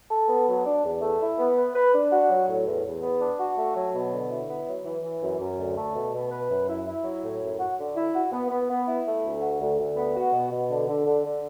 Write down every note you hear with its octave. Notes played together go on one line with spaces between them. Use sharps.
A4
B3
F#3
D4
E2
A3
E4
B3
B4
B4
D4
F#4
F#3
A2
E2
E2
B3
D4
F#4
A3
F#3
B2
D3
E4
B3
F#3
E3
E3
F#2
F#2
D2
A3
B2
B2
B4
F#2
E4
E4
F#3
A2
F#2
F#4
D3
E4
F#4
B3
B3
B3
E4
A3
D2
F#4
D2
D2
B3
F#4
B2
B2
D3
D3
D3
D3